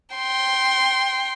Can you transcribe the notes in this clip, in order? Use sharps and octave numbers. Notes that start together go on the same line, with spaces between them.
G5 C6